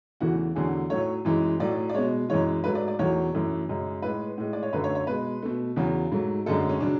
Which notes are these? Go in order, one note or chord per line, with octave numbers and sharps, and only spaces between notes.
E2 C#3 E3 A3 F#4
E2 D3 F#3 A3 G#4
A2 F#3 A3 C#5
F#2 E3 G#3
A2 F#3 A3 D5
D5
B2 G#3 C#5
F#2 E3 G#3 C#5
G#2 F#3 A3 B4
D5
D5
E2 B2 F#3 A3 C#5
F#2 E3 A3
F#2 C#3 G#3
A2 G#3 B4
A2 G#3
D5
C#5
F#2 D3 A3 B4
C#5
C#5
B2 G#3 B4
B2 A3
E2 C#3 F#3
G#2 F#3 A3
F#2 D3 G#3 A4
C#4
C#3 F#3 D4